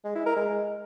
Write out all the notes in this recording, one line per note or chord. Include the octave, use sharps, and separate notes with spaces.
G#3
E4
A#4
G#3